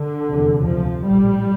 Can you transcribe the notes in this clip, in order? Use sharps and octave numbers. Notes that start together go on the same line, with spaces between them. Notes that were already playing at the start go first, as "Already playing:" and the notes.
Already playing: D3
F1 E2 C3
D2 C3 F3
A#1 A2 G3